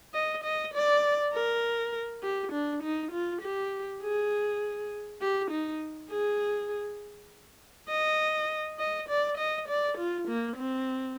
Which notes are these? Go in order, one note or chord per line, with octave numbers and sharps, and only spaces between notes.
D#5
D#5
D5
A#4
G4
D4
D#4
F4
G4
G#4
G4
D#4
G#4
D#5
D#5
D5
D#5
D5
F4
A#3
C4